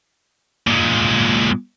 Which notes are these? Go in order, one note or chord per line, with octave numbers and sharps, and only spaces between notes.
A#2 G#3